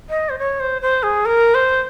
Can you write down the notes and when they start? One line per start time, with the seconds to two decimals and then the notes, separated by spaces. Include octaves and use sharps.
0.09 D#5
0.29 C5
0.39 C#5
0.60 C5
0.82 C5
1.03 G#4
1.25 A#4
1.54 C5